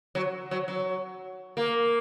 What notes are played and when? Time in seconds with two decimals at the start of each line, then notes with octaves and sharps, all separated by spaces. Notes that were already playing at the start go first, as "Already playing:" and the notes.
0.15 F#3
0.51 F#3
0.68 F#3
1.57 A#3